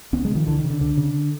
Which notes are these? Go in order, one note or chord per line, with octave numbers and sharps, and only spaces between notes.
C#2 B3 C#4
F#3 G#3
C#3
D#3 F3
C#2 D3 E3
D#3
C#3
D3
C#2 D3
C#3